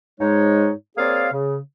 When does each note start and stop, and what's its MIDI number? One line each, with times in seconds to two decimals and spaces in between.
0.19 0.70 44
0.19 0.70 56
0.19 0.70 63
0.19 0.70 73
0.97 1.27 58
0.97 1.27 60
0.97 1.27 68
0.97 1.27 73
0.97 1.27 74
0.97 1.27 77
1.32 1.57 49